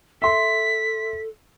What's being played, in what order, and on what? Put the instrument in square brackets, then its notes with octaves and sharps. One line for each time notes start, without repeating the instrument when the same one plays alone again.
[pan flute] A4 [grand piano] E5 C6 [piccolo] B6